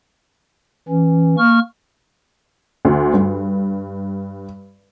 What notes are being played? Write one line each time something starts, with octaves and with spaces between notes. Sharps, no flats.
E3 C#4
A#3 C#6 F6
D2
G2